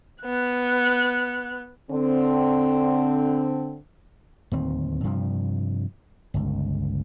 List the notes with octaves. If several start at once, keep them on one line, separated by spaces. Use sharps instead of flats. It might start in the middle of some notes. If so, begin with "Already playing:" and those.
B3 F#6
D3 C4
D1 D#2 C4
G2 C3 F3
G1 C#2